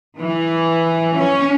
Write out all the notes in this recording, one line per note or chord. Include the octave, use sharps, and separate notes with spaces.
E3
C#4